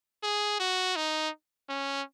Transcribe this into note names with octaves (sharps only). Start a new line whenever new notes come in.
G#4
F#4
D#4
C#4